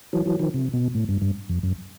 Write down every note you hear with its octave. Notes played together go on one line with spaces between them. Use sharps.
E3 F#3
E3 F#3
D#3 F3
C3
B2
A2
G2
G2
F2
F#2